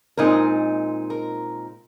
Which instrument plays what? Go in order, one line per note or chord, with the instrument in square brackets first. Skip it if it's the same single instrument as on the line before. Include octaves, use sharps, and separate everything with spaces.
[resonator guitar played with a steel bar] A#2 G#3 C4 D#4 A#4
A#4